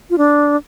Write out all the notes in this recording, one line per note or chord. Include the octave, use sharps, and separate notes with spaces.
F4
D4